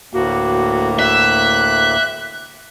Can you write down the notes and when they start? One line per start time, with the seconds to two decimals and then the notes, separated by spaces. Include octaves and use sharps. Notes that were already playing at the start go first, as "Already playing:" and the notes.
0.14 D2 A2 A#3 F#4
0.99 E5 F#6